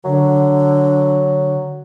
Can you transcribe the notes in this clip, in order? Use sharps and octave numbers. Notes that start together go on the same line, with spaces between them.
D3 F#3